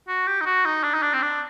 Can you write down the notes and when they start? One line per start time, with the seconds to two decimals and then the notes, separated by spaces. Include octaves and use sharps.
0.08 F#4
0.27 G4
0.41 D#4
0.46 F#4
0.65 D#4
0.83 D4
0.94 D#4
1.03 D4
1.14 C4
1.22 D4